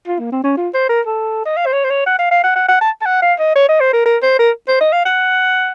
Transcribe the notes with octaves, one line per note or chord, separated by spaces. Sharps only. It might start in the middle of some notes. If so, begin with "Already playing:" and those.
F4
A#3
C4
C#4
F4
C5
A#4
A4
D#5
F5
C5
C#5
C5
C#5
F#5
F5
F5
F#5
F#5
F#5
A5
A5
F#5
F5
D#5
C#5
D#5
C5
A#4
A#4
C5
A#4
C5
D#5
F5
F#5